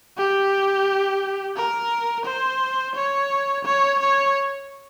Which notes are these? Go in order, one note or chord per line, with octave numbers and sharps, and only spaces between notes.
G4
A#4
C5
C#5
C#5
C#5